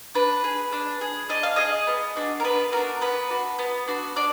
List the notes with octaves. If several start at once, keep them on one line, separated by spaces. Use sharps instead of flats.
D4 B4
G#4
D4
G#4
D4 D#5
F5
G#4 D#5
B3
D4 F#4
A#4
B3 B4
D4 F#4 A#4
B3 B4
D4 F#4
B3
D4 F#4
D4 D5